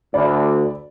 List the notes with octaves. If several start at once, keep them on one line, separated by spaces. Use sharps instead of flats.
D2 D5 B5